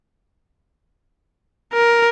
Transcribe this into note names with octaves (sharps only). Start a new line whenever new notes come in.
A#4